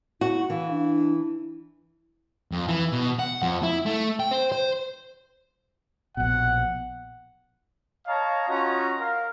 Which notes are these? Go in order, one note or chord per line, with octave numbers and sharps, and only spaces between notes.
E4 F#4
E3 F5
D4
F2
E3
B2
F#5
F2
E4
A3
G5
C5
C5
A#1 B2 F#5
C#5 D#5 F5 A5 A#5
C#4 F4 F#4 D#5 A#5
A#4 F5